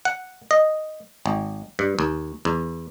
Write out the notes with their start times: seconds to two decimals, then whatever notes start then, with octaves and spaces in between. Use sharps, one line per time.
0.05 F#5
0.51 D#5
1.26 G#1
1.79 G2
1.99 D#2
2.45 E2